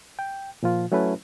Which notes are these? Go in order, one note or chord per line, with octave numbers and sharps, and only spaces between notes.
G5
A#2 F3 F4
F#3 A3 C#4 E4 B4